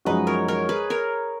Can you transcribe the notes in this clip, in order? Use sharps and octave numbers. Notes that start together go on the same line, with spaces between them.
F#2 F3 G#3 D#4 F#4 B4 D#5
A#4 C#5
A#4 C#5
G#4 B4
A#4 C#5